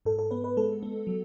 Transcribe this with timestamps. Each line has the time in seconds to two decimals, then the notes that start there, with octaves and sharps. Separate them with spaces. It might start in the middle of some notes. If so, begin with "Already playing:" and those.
0.05 G#2 A4
0.19 A4
0.31 B3 B4
0.44 B4
0.57 G#3 A4
0.83 B3
1.07 F#3